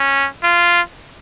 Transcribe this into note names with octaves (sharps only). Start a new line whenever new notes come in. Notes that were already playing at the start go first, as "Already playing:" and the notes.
Already playing: C#4
F4